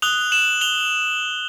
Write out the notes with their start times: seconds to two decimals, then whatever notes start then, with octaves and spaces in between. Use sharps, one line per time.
0.02 D#6 F#6 F7 G7
0.32 E7 F#7
0.61 F7 G7